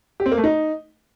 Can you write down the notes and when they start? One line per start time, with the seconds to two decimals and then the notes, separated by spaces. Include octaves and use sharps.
0.20 G4
0.26 C4
0.32 A#3
0.38 A3
0.44 D#4